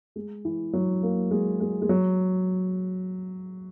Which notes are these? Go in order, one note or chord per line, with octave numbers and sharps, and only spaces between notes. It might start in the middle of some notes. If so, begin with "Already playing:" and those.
G#3
E3
F#3
A#3
G#3
G#3
G#3
F#3